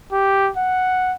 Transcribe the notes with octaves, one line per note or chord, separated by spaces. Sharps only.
G4
F#5